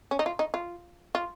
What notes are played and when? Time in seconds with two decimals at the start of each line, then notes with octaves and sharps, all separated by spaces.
0.11 C#4
0.19 D#4
0.26 F4
0.39 D#4
0.54 F4
1.15 F4